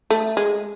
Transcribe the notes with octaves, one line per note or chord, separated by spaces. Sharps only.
A3
G#3